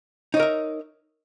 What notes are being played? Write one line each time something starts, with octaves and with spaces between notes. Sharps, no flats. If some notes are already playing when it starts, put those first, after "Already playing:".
D#4 A#4 C#5 E5